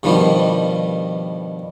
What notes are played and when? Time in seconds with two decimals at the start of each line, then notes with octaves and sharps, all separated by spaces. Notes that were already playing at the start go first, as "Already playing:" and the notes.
0.03 G2 B2 D#3 F3 G3